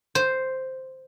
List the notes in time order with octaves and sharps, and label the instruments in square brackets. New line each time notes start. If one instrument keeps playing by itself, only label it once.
[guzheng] C5